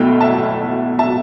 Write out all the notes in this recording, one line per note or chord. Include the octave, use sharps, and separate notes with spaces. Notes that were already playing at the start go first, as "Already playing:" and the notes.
Already playing: B1 B2 A3 E4 G5
E5 A5
E5 A5